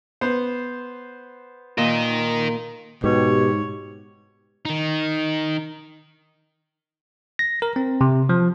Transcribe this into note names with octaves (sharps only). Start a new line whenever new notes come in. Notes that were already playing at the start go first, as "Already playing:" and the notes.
B3 C5
A#2 A#4 D#5
G#2 B2 G4 C#5
D#3 D#4
A#6
A#4
C4
C3
F3